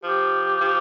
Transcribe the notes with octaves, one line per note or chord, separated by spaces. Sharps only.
F3 G4
F3